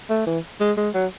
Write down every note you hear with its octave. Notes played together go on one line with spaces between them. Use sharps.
A3
E3
G#3
G#3
F#3